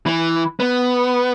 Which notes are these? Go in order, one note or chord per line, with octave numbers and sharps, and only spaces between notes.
E3
B3